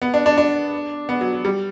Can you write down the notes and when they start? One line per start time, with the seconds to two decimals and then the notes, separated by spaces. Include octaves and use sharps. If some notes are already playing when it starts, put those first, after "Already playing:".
0.02 B3
0.14 D4
0.26 D4
0.38 D4
1.09 B3
1.21 F#3
1.33 F#3
1.45 G3